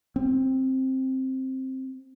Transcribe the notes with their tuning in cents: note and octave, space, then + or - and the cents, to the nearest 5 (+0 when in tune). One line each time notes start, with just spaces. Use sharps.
C4 +5